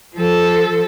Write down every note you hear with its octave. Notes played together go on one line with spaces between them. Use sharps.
F3 A4